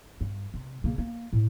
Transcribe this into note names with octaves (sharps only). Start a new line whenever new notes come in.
G2
C3
C#3 A#3
A#3
A2